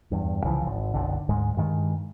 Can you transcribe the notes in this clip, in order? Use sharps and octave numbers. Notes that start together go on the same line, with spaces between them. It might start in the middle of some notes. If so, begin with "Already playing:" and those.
E2 G2
C2 C#3 E3 F3
G#1
F#1 B1 D3
D2 G#2 G#3
G2 D#3 G3 G#3